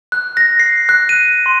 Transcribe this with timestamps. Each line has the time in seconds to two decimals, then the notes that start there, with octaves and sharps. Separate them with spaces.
0.12 F#6
0.37 A#6
0.59 C7
0.89 F#6
1.09 D#7
1.46 C6